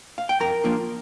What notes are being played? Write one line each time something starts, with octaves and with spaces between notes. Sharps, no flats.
F5
G5
F2 A#4 A#5
F3 A#3 D4 F4